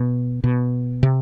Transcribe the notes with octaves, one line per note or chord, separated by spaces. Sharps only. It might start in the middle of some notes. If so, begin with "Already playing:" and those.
Already playing: B2
B2
C3